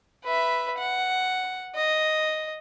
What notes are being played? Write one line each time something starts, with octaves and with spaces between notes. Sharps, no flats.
B4 E5
F#5
D#5